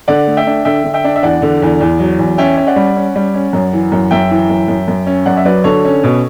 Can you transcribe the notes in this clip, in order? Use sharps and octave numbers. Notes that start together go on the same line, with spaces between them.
D3 D5 F#5
A3
E5 G5
D4
D3 E5 G5
D3
E5 G5
D4
E5
E2 D5 F#5
D3
E2
E2
F#3
E2
C#4 E5 G5
C#4
D5 F#5
G3
C#4
G3
C#4
F#2
E3
F#2
F#2 E5 G5
E3
F#2
F#2
F#2
C#4
F#2 D5 F#5
E5
F#3 B4 D5
D3 A4 C#5
C#4
B2